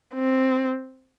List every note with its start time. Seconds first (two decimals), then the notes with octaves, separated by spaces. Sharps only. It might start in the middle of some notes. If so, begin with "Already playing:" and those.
0.14 C4